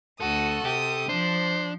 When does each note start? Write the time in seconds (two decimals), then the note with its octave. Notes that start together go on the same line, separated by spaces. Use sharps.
0.21 D2 F#4 A4 D#6
0.65 C3 G4 D#6
1.09 F3 D4 C5